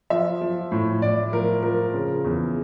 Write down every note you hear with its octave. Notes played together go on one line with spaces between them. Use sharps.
F3 E5
F3
A2
A2 D5
F3 A#4
F3 A#4
C#3
E2